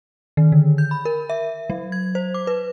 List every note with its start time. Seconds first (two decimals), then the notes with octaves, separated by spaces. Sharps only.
0.37 D#3
0.52 D3
0.78 G6
0.91 B5
1.05 A#4
1.30 E5
1.70 F#3
1.92 G#6
2.15 C5
2.34 D6
2.47 B4